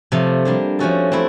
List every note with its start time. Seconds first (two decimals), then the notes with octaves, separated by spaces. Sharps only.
0.12 C3 F3 A3
0.45 G3 A#3 D4
0.79 F3 A3 C#4 F#4 A4
1.12 A3 C4 E4